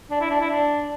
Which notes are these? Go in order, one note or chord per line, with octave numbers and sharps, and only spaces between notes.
D4
E4
D4
E4
D4